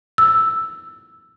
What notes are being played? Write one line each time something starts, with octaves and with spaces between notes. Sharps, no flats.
E6